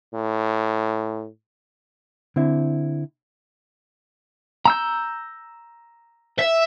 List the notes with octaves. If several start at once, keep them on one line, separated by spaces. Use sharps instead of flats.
A2
D3 C4 E4
A#5 E6 G6
E5